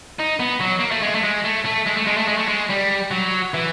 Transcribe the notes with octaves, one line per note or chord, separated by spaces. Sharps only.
D#4
B3
F#3
A#3
A3
G#3
A3
G#3
A3
A3
G#3
A3
G#3
A3
G#3
A3
G#3
G3
F#3
E3